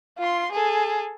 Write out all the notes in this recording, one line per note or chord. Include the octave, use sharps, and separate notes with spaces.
F4 C6
G#4 A4